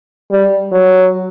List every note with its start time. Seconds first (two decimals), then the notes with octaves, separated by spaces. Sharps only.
0.31 G3
0.72 F#3